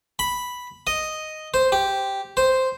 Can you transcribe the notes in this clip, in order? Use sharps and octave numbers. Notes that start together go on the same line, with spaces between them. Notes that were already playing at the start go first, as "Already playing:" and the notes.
B5
D#5
C5
G4
C5